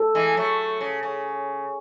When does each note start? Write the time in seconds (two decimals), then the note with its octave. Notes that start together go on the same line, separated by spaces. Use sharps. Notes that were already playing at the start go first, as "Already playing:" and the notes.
Already playing: A4
0.15 E3 G#3
0.37 F#3 A3
0.81 C#3
1.03 C#3